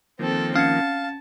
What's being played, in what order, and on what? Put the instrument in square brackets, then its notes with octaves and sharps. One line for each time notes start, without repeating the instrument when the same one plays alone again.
[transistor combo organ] D#3 F3 A#3 [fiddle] C4 A4
[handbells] C#4 G#6 C#7 [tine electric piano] F5 [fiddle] A5